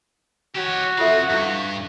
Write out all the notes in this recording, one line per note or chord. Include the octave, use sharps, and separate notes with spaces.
F#4 G4 C#5
C4 F4 A4 E5 F5
G2 E4 C#6